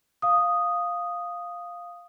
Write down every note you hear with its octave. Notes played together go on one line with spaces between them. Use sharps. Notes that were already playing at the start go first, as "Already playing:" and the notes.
F5 D#6